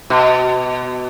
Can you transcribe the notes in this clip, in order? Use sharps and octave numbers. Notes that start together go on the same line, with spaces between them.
B2